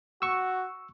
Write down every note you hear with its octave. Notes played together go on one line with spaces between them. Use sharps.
F#4 C#6 E6